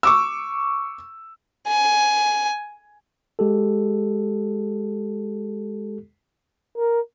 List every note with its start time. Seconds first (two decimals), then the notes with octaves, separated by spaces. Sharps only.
0.03 C#6 D6 E6
1.68 G#5
3.39 G#3 G4 A4
6.77 A#4